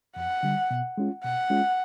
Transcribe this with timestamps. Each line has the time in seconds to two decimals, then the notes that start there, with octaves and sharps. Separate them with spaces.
0.16 F2 F#5
0.43 D3 G3
0.71 B2
0.98 G#3 C#4 F4
1.24 B2 F#5
1.50 G#3 C#4 F4